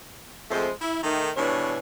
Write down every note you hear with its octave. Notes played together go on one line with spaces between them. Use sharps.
F2 G#3 A3 C5
E4
D#3 A3
B2 E3 G3 D4 C#5